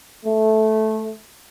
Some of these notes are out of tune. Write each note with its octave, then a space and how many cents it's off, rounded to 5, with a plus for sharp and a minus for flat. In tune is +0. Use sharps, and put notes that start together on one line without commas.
A3 -10